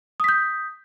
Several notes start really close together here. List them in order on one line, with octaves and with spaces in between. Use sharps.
D#6 B6 G6